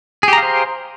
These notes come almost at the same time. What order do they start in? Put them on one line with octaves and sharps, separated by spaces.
G#4 G4 A#5 F5 C5